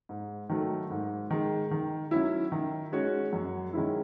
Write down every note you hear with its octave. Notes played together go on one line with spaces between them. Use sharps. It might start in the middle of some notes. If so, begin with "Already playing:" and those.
G#2
D#3 F#3 A3
G#2
D#3 G#3
D#3
F#3 C#4 E4
D#3
G#3 C#4 F#4 C#5
F#2
D#3 G#3 C#4 E4